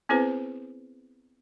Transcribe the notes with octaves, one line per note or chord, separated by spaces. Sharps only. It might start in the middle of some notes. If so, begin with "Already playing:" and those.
B3 C4 E4 G#4 B4 C5